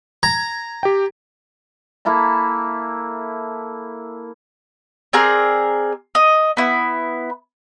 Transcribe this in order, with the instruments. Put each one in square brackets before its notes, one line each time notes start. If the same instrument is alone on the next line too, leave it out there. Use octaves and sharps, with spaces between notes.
[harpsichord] A#5 [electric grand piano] G#6
[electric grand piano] G4 G5
[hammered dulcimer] A#3 E4 A4 B5
[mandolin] C4 G#4 A#4 D5
D#5
B3 E4